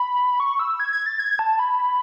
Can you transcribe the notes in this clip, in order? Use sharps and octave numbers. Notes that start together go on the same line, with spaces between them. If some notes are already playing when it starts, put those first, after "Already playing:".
Already playing: B5
C#6
E6
G#6
G#6
A6
G#6
A5
B5